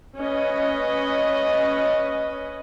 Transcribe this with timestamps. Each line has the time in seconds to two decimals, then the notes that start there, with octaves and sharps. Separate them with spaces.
0.17 C#4 B4 D#5